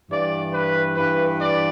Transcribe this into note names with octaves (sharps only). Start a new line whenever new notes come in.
G2 E3 D5
B4
G2 E3 B4
D5